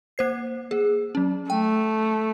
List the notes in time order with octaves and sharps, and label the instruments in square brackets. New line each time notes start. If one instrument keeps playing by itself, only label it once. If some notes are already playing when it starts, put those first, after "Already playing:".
[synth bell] A#3 C5 C7
A#3 G#4
F#3 C#4
[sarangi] A3 [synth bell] G5